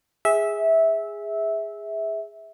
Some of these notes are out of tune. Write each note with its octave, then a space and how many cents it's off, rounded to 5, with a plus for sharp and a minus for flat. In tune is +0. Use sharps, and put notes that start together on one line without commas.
G#4 -10 E5 -15